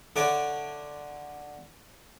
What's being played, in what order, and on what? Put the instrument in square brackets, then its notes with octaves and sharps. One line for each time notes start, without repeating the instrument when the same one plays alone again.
[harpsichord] D3 D4 C#5 E5 A5 D6